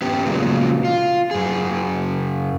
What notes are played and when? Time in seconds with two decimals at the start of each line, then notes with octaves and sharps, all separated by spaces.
0.02 B3 C#4 G4
0.26 A#2 C#3 F3 F#3 G#3
0.85 F4
1.31 F#2 G#4